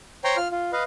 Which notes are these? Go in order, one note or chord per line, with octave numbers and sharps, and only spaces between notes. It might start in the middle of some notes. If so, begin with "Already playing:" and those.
C5 C#5 G5 A#5 C6
F4 F6
F4
B4 D#5 F5